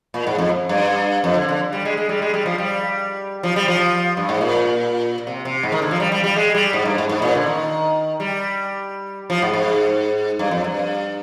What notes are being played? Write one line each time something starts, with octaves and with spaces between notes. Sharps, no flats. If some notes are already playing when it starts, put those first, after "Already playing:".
A#2
G#2
F2
G2
F2
D3
D3
G3
G#3
G#3
G3
G#3
G3
F3
G3
F3
G3
F3
G2
G#2
A#2
C3
C3
G#2
D#3
D3
F3
G3
G3
G3
G#3
G3
G#2
G2
G#2
G#2
A#2
D3
D#3
G3
F3
G#2
G#2
G2
F2
G2